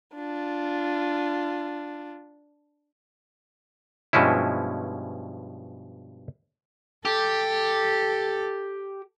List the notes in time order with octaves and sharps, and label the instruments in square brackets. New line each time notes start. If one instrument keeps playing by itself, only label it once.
[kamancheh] D4 F4
[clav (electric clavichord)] G2 B2 F3 G#3 C#4 E4
[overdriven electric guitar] G4 [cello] A4